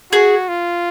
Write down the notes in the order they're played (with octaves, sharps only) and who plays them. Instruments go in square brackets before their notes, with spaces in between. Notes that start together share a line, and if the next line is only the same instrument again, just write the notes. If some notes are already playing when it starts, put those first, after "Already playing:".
[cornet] F#4 [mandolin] G#4
[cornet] F4